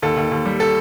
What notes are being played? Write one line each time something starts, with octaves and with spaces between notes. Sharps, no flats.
D#2 A4
D#2
D#2
G3
A4